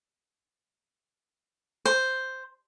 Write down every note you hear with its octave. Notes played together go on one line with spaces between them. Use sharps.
C5